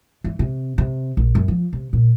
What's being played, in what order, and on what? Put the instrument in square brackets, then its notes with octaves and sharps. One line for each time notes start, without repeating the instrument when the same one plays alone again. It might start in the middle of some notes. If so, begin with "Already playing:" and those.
[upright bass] E3
C3
C3
A#1
F#2
F3
C3
A#2